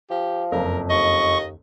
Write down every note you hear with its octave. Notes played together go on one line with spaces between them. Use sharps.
F3 G4
F#1 F2 A#4
D#2 D#5 C#6